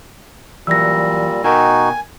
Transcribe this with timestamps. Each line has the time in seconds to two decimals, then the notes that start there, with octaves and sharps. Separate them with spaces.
0.67 A#2 E3 F#3 G3 E6 A#6
1.44 B2 D#4 F#4 A#4 G5 G#5